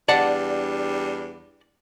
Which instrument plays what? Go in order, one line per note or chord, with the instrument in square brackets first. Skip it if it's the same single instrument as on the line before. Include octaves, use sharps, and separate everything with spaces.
[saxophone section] E2 G3 D4 [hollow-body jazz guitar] D5 F#5 A5